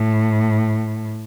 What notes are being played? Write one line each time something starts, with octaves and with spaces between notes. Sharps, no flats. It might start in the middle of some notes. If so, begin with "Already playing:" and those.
Already playing: A2